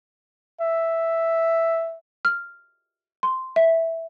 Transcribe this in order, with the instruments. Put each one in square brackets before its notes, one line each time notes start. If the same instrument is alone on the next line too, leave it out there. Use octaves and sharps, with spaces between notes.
[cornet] E5
[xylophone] F6
C6
E5